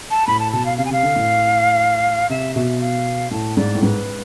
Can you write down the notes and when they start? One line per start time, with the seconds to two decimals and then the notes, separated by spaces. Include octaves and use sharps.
0.11 A5
0.27 A2 B5
0.40 A5
0.53 B2 A5
0.66 F5
0.78 C3 F5
0.85 G#5
0.90 C3 F5
1.03 D3
1.16 A2
2.29 C3 E5
2.55 B2 E5
2.81 F5
3.31 A2 A5
3.57 G#2 D5
3.75 A2
3.82 G#2 B4